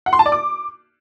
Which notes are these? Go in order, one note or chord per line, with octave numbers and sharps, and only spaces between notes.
F#5
C6
A5
D5
D6